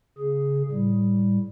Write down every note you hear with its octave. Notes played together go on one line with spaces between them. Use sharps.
C#3 G#4
A2 G3